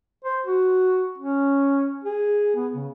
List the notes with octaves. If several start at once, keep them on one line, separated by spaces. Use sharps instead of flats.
C5
F#4
C#4
G#4
B3
C#3